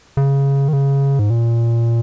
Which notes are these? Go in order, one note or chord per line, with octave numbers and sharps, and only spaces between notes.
C#3
D#3
C#3
G#2
A#2